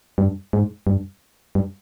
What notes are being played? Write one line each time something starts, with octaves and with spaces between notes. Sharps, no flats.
G2
G#2
G2
G2